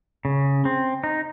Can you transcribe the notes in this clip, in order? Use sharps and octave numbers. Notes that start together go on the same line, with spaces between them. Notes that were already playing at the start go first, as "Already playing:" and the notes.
C#3
C4
D#4